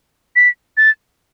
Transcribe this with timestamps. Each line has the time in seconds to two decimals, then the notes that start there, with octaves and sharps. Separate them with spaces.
0.36 B6
0.77 A6